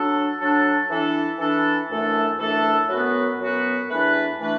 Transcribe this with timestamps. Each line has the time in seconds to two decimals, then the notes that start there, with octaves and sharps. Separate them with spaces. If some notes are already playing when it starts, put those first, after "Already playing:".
Already playing: F#3 D4 A4
0.40 F#3 D4 A4
0.90 E3 D4 A4
1.39 E3 D4 A4
1.89 F#2 E3 A3 D4 A4
2.39 F#2 E3 A3 D4 A4
2.89 F#2 F#3 B3 F#4 B4
3.39 F#2 F#3 B3 F#4 B4
3.89 E2 E3 A3 D4 B4
4.40 E3 A3 D4 B4